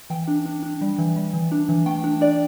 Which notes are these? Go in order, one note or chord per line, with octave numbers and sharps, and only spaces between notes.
E3 G5
D4
D4
D4
G3
E3
G3
E3
D4
E3
A3 G5
D4
D4 D5